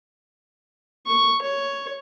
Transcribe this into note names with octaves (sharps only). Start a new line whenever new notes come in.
C#6
C#5